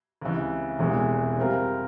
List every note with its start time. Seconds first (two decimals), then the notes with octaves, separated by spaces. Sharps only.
0.21 C#2 C3 E3
0.79 E1 E2 C3 E3 G#3
1.38 C3 G3 C4 F4 A#4